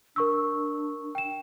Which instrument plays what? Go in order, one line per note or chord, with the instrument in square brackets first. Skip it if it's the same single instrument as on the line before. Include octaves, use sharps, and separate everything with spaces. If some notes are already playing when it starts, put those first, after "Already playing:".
[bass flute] D4 [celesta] A#4 C#6 E6
[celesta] G5 E7